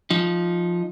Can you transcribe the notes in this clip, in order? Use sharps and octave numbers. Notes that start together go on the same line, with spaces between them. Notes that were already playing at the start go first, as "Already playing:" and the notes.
F3 D#4